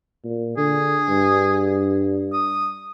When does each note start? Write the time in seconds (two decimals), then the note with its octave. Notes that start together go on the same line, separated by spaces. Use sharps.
0.25 A#2
0.57 D3 G#4
1.08 G2
2.33 D#6